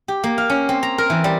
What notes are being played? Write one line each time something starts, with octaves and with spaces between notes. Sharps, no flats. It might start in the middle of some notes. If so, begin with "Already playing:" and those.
G4
A#3
F5
C#4
C4
A#5
A#4
E3
G3